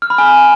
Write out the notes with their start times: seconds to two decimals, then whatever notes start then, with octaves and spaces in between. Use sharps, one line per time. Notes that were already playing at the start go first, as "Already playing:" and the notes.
0.02 F6
0.10 B5
0.18 G#5